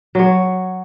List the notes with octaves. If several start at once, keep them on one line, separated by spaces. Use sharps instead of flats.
F#3 C#5